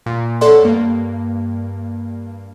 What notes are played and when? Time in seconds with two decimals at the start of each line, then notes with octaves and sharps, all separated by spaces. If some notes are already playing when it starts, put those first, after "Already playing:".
0.06 A#2
0.41 A4 C#5 D5 E5 F#5 C6
0.62 G2 A#3